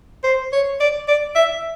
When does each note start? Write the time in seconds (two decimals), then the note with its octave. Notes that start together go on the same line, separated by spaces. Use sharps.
0.24 C5
0.53 C#5
0.80 D5
1.08 D5
1.35 E5